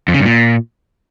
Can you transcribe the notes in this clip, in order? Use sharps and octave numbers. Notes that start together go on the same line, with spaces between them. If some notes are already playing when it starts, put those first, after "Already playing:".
F2
C#3
G2
A#2